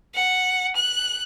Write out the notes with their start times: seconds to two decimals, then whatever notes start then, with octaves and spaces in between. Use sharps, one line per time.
0.14 F#5
0.76 F#6